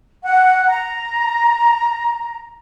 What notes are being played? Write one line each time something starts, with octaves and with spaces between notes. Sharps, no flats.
F#5
A#5